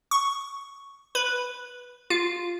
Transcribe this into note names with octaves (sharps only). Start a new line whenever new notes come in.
C#6
B4
F4